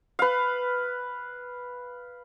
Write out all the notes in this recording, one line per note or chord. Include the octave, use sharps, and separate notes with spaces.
B4 F5